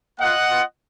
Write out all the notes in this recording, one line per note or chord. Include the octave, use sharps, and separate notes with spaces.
A#3 F4 D#5 F#5
B3 F4